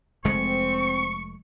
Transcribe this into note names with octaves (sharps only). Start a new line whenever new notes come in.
F1 G#3 A3 C4 C#6